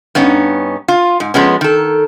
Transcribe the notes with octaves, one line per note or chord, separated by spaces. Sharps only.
G2 B3 C#4 D#4
F4
G#2
F3 G#3 B3 C#4
D#3 A4